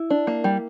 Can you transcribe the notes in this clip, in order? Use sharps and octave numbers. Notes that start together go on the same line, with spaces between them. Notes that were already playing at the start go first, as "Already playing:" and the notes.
Already playing: E4
D4
A#3
G3